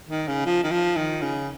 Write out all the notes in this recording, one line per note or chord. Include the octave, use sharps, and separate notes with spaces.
D#3
C#3
F3
D#3
F3
D#3
C#3